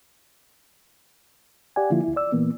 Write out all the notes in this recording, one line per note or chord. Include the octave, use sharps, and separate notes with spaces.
G4 D5 F#5 G#5
D3 F3 A#3 E4 F4
D2 E4
D5 E6
A#2 E3 A#3 B3